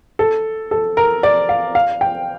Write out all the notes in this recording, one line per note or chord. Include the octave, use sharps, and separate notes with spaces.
A4
A4
A#4
D5
F5
F5
G5